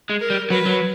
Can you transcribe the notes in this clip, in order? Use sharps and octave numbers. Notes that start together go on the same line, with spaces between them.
G#3
A#4
G3
F#3 B4
F#3